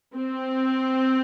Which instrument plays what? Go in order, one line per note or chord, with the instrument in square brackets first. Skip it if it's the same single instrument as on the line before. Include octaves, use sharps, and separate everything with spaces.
[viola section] C4